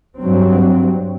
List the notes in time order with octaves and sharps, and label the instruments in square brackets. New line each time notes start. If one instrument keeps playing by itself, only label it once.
[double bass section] G2 F#3 C4